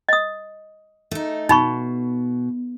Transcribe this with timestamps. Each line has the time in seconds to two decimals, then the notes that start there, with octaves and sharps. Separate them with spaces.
0.09 D#5 D#6
1.11 A3 D#4
1.49 B2 D#4 B5 C#6